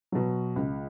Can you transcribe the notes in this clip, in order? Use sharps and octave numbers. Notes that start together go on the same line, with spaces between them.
B2 F#3
C#2